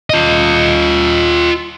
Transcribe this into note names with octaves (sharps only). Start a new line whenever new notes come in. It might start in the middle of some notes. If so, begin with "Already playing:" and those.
F4 D#5